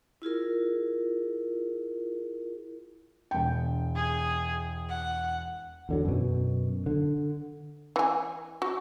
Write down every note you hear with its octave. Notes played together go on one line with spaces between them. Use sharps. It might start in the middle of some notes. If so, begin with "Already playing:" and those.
E4 F4 G#4 A#4
E1 G5
G#4
F#5
E2 D3 F#3
F#2 B2
D3
E3 G#5
F#4